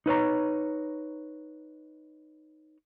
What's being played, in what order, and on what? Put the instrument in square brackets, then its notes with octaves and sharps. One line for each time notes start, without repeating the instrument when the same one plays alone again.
[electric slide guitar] D#4 B4 C#5 A#5